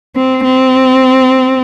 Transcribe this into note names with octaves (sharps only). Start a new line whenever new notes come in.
C4
C4